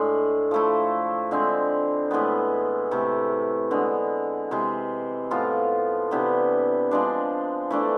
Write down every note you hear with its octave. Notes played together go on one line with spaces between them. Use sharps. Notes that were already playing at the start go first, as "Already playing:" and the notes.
Already playing: A2 G#3 D4
F3 A3 E4
D3 G#3 C4
A2 E3 G#3 B3
C3 E3 A3 E4
D3 G#3 B3
C3 E3 G#3
A2 F3 B3 F4
C3 E3 B3 D4
F3 G#3 D4
E3 A3 D4